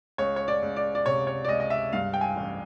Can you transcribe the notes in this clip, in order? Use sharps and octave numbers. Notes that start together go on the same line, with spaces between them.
C#2 C#5
C#5
D5
C#2
D5
D5
C3 C#5
C#5
D5
C#2 D#5
D#5
E5
G2 F5
G5
G#5
A1